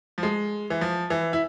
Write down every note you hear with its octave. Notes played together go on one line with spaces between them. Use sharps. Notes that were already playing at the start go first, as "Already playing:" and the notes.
F3
G#3
E3
F3
E3
E4